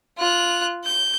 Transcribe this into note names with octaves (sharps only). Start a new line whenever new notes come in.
F4 F#6
G6